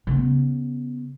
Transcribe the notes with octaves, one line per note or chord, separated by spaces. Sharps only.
C#3 B3